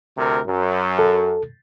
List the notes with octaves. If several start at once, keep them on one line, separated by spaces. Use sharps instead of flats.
D2 C3 A#4
F#2
A4